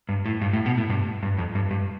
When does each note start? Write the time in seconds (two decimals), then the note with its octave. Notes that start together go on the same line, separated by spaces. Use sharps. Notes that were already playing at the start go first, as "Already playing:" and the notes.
0.09 G2
0.26 A2
0.41 G2
0.53 A2
0.66 B2
0.78 A2
0.90 G2
1.23 G2
1.38 F2
1.55 G2
1.71 G2